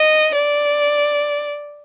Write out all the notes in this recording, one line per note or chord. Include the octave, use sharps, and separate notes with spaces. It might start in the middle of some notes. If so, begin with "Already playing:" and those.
Already playing: D#5
D5